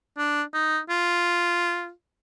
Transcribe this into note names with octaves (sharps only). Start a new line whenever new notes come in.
D4
D#4
F4